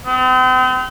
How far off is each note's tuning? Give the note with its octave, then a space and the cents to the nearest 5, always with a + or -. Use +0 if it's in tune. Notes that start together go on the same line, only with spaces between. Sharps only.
C4 -40